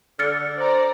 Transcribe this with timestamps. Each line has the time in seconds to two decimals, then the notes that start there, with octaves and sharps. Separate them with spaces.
0.19 D3 F6 A6 C#7
0.58 C5 D5 A#5